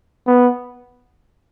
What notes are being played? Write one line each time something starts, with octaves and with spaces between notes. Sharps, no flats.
B3